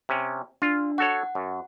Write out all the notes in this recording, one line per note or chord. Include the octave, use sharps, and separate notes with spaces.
C3 C#4
D4 F4
F#4 A4 C#5 F#5
F#2